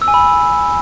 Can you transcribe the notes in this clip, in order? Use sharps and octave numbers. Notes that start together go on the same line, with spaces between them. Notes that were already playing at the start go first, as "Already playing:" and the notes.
E6
G#5
B5